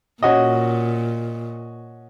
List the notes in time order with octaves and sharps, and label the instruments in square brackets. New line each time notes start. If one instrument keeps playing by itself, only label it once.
[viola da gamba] A#2 [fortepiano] C#4 F#4 D#5